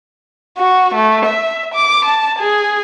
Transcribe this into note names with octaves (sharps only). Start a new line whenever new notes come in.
F#4
A3
E5
D6
A5
G#4